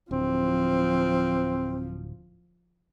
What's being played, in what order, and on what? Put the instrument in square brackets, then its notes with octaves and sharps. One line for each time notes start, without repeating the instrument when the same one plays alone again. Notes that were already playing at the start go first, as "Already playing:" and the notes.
[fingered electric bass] D1 [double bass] F3 [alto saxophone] C4